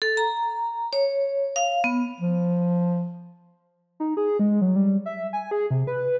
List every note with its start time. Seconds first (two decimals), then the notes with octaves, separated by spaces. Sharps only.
0.02 A4
0.17 A#5
0.93 C#5
1.56 F5
1.84 B3
2.20 F3
4.00 D#4
4.17 G#4
4.39 G#3
4.61 F#3
4.76 G3
5.06 E5
5.33 G#5
5.51 G#4
5.71 C3
5.87 B4